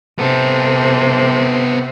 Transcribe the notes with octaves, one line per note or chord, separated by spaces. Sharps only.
C3 B3 A4